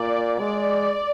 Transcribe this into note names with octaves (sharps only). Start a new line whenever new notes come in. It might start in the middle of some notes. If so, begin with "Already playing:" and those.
Already playing: A#2 D5
G#3 D5